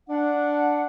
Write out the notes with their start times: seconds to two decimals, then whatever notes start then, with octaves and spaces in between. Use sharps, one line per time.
0.10 D4 F#5